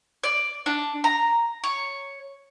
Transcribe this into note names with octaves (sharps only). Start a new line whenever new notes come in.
D5
D4
A#5
C#5